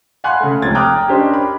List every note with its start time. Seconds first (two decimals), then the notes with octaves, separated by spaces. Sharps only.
0.24 F5 F#5 G#5 B5 C6 F#6
0.40 C#3 A3
0.62 F1 C#2 C4 G#6 A6
0.75 G5 A#5 D6 D#6 F6 F#6
1.08 C#4 D4 G4 A#4 C5 D#5
1.34 B5